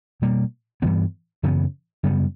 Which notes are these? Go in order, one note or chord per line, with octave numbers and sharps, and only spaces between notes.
B2 G3 A#3
G2 E3 G3 B3
F#2 C#3 E3 B3
F#2 C#3 G3 B3